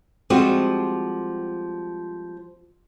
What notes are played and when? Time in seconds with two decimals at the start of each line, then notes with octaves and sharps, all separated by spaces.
0.30 F3 G3 G#3 C4 F4 F#4